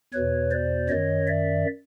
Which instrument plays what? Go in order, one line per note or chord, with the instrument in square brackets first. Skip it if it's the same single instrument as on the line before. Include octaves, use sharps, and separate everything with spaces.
[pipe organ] E2 B2 B4 C#5
C5 D5
F#2 D#3 C#5 D#5
D5 E5